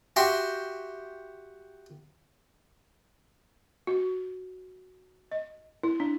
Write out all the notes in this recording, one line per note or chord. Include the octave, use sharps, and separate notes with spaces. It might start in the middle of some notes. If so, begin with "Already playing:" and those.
F#4 G4 E5 G5 C6
F#4
D#5
E4
D4